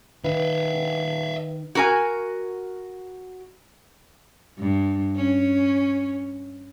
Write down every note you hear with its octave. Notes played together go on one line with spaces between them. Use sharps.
D#3 B4 E5 F5
F#4 A#4 G#5
G2
C#4